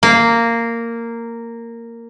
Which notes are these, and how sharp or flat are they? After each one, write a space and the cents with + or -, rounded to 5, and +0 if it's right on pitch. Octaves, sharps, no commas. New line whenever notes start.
A#3 -10